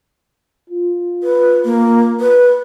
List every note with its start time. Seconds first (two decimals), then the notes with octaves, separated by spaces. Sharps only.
0.70 F4
1.23 B4
1.65 A#3
2.20 B4